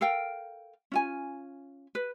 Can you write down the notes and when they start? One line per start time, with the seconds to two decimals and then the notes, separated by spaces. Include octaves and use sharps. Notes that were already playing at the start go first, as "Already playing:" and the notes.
0.01 A4 A#4 F5 G5
0.92 C#4 F4 G#5
1.95 B4